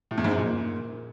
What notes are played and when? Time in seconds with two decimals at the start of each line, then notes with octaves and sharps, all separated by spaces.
0.11 A2
0.18 E2
0.24 G#2
0.31 F#2
0.38 A#2